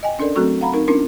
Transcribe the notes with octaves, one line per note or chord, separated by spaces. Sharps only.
D#5 G5 G#5
C#4 D4 A4 A#4 D5
F#3 A3 C4 F#4 A4 C#6
F5 F#5 A#5 B5
C4 D#4 A#4
B3 C#4 D4 E4 A#4